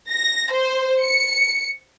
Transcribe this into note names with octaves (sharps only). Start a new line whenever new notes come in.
A#6
C5
C#7